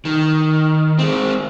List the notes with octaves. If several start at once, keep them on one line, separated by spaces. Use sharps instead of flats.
D#3
G#3 C4